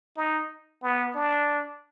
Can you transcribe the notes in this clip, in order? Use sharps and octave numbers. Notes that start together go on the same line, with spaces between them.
D#4
B3
D4